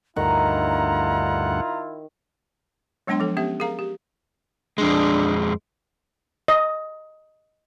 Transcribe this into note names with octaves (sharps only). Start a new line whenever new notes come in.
D2 G2 D#3 E4 F4 F#5 A#5
F#3 G#3 B3 D4 G5 C6
F3 A4
B3 C#4 G4 E5
G#4 A#4 F5 A#5
G4
F2 G#3 D4
D#5